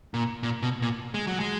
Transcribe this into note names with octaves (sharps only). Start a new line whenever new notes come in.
A#2
A#2
B2
A#2
G#3
F#3
G#3